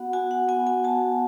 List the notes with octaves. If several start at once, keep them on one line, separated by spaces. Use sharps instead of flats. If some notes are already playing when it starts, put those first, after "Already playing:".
Already playing: B3 F#4 F#5
F#4 G#5
F#5
B3 G#5
G#5
F#4 A5